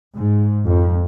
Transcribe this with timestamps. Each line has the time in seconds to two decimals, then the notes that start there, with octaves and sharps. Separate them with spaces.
0.16 G#2
0.66 F2